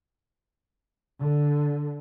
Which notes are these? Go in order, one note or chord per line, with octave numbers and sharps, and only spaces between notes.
D3